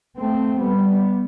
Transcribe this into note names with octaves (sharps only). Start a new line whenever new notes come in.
A3 C4
G3 B3